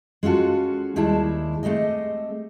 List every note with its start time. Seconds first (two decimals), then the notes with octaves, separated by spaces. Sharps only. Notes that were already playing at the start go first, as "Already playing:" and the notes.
0.23 G#3 C#4 F4 F#4 A4
0.96 D#2 D#3 G3 G#3 E4 A5
1.63 G#3 A3 C4 G4 D#5